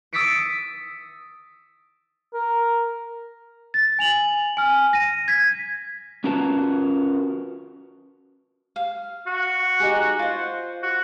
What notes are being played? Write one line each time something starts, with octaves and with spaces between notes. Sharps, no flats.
D#6 E6 A6 B6 C#7 D7
A#4
A6
G#5 F7 F#7
G#5 F6
A#6 D#7
G#6 B6
C#4 F4 F#4 A#4 B4 A5
F5
F#4
D#4 G4 G#4
F4 C5
F#4